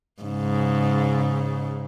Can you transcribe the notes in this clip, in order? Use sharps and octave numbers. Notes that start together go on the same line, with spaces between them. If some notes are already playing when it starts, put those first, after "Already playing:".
G#2 C#3